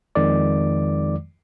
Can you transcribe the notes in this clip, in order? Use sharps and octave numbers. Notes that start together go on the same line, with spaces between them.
F2 D#3 G#3 D5 D6